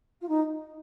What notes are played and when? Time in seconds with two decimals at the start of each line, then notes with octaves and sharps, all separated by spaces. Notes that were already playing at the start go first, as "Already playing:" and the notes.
0.21 F4
0.28 D#4